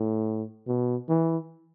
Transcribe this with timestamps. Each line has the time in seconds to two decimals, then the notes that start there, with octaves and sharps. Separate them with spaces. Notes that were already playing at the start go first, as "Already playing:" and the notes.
Already playing: A2
0.68 B2
1.09 E3